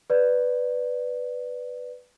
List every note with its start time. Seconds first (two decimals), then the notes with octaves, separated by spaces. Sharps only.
0.10 B4 D5